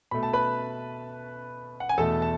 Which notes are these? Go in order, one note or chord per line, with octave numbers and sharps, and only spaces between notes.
B2 A3 B5
A5
B4 B5
F#5
G#5
E2 B2 A3 A4 A5
A5